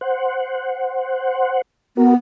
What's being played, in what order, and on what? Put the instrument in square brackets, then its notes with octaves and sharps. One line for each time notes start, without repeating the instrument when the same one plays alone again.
[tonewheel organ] C5 F#5
[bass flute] B3 [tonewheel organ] F#4 A#4